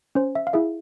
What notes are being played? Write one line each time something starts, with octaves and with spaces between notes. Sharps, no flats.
C#4 C5
E5
F5
E4 G#4 E5